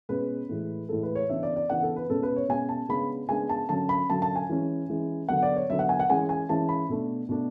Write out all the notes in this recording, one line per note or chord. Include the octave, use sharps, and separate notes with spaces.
B2 G#3 C#4 B4
A2 E3 G#3
A2 E3 G#3 A4
B4
C#5
C#3 E3 B3 D4 E5
D5
D5
C#3 E3 B3 D4 F#5
A4
B4
B2 G#3 C#4 A4
B4
C#5
B2 G#3 C#4 G#5
A5
C#3 G#3 B3 D4 B5
C#3 G#3 B3 D4 G#5
A5
D3 F#3 C#4 A5
B5
D3 F#3 C#4 A5
A5
G#5
E3 G#3 C#4
E3 G#3 C#4
D3 F#3 B3 F#5
D5
C#5
D3 F#3 B3 E5
F#5
G#5
F#5
E3 G#3 C#4 G#5
G#5
E3 G#3 C#4 A5
B5
B2 A3 D4
B2 A3 D4